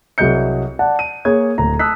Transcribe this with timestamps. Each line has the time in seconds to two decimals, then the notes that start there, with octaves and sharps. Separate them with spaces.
0.18 C2 F#3 G#4 D#5 G6 C#7
0.79 D5 F#5 A5
0.99 D#7
1.25 A#3 G#4 C#5 G#6
1.58 D1 A#5
1.79 A5 D#6 E6 F#6 B6